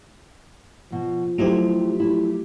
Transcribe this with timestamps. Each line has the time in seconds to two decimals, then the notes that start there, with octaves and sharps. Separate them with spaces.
0.92 B2 F3
1.38 F#3 A3 D#4 E4 G4 C5
2.00 E4